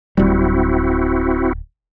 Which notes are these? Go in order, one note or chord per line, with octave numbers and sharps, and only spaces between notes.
D1 G3 C4 E4 F#4